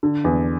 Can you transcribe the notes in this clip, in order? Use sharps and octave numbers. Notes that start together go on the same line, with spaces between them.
D3
E2